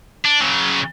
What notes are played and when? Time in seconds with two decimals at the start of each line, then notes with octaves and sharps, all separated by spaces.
0.25 D4
0.40 C#3 F#3